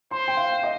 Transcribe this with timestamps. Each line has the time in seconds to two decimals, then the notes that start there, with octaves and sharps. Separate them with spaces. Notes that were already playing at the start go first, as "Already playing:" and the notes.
0.11 C5 C6
0.28 G5
0.37 F5
0.63 D#5